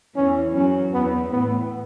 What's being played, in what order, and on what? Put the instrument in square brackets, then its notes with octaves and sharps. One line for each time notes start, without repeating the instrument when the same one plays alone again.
[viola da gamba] E2 E3 [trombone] C#4
[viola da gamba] F#2 F#3 [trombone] C#4
[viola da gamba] E2 E3 [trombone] B3
[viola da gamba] A2 [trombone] B3